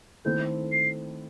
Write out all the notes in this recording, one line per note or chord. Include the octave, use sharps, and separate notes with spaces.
D#3 A3 C4 E4 A4 G6
C7